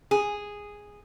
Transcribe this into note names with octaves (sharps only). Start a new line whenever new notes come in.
G#4